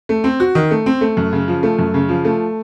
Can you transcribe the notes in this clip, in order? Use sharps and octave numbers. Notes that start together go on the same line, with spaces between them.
A3
C4
F#4
D#3
A3
C4
A3
F#2
C#3
F3
A3
F#2
C#3
F3
A3